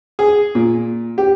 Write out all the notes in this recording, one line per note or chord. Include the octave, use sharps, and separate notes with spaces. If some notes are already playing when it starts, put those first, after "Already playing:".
G#4
A#2
G4